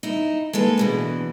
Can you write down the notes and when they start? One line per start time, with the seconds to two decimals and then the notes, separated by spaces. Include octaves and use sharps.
0.03 D#4 E4
0.53 G#3 A#3 A4 B4
0.78 D2 B2 E3